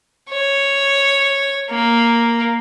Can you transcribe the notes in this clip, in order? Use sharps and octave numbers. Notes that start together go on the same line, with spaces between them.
C#5
A#3